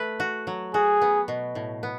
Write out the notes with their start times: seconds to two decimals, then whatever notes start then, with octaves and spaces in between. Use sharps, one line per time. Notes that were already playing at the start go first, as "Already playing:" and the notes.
Already playing: A3 B4
0.20 F#4
0.47 F#3
0.74 F#4 G#4
1.02 B3
1.28 B2
1.55 A2
1.83 B3